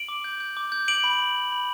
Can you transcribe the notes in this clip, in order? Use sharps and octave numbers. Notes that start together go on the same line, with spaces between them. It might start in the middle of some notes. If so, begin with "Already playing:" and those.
Already playing: D7 F#7
D6
G6
G6
D6
G6
D6 D7 F#7
B5
B5
G6
B5